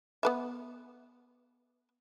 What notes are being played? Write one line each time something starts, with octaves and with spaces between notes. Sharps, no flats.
B3 B4 E5